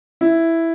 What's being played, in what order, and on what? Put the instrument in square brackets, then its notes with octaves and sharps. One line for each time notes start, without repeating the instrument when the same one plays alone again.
[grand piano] E4